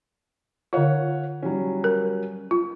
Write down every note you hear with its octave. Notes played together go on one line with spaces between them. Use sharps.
D3 F4 C#5 F5 F#5
F#3 G3 C#4
A#4
F4